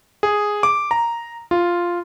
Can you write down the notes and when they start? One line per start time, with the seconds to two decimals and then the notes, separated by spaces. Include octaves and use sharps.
0.23 G#4
0.63 D6
0.91 A#5
1.51 F4